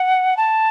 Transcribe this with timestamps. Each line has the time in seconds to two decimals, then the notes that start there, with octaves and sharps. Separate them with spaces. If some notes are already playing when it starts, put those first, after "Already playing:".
Already playing: F#5
0.37 A5